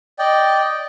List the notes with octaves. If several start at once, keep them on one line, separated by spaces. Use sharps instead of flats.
D5 D#5 G5